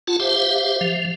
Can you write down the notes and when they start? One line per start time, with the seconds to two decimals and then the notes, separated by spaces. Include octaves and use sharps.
0.07 F4 F#5 A5
0.20 G4 C5 E5 F5
0.81 F3